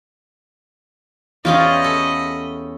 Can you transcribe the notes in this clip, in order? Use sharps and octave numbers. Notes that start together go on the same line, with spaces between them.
E2 C#4 F4 G4 G#4 D5 D#5 B5
A4